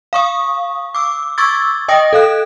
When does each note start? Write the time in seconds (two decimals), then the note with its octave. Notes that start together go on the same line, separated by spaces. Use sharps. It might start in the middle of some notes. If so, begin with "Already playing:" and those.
0.13 F5 C#6 D#6
0.95 D6 E6
1.38 C#6 D6 E6 G#6 A6
1.88 D#5 G5 D#6 A#6
2.13 A4 F5 F#6